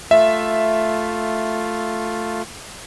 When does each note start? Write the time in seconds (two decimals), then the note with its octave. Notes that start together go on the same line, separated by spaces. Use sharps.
0.11 A3 F4 E5